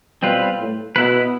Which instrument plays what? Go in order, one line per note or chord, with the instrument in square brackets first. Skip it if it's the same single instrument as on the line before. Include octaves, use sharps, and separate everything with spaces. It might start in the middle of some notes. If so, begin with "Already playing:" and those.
[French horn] B2 [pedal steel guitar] G3 C4 F4 B4
[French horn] A2
[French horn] B2 [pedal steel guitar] B3 E4 B4